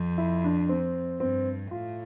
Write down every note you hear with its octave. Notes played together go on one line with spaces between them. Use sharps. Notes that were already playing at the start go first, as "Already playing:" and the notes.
Already playing: F2
E4
D4
C4
G2 C4
A2 F4